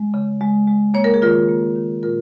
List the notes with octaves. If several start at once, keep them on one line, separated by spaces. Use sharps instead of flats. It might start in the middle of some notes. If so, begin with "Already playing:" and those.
Already playing: G#3
C#3
G#3
G#3
A#3 C#5
A#4
G#4
D#3 F4 A#4
A#3
D#3
A#2 F4 A#4